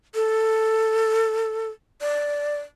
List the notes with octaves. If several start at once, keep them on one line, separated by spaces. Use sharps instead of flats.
A4
D5